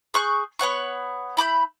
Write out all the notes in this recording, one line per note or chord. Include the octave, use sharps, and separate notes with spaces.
G#4 C#6 F#6 G6
B3 C#5 F#5 C#6
E4 B5 D6 G6